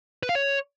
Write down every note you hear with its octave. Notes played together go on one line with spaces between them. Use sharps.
B4
F5
C#5